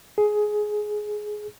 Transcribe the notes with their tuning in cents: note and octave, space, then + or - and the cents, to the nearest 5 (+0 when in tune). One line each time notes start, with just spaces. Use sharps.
G#4 +15